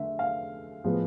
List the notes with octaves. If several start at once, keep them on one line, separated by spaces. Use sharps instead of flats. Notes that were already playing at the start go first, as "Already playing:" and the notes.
Already playing: D3 A3 E5
F5
A2 F3 G#3 B3